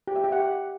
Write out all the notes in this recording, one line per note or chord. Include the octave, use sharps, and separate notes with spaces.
G4
E5
G4
F#5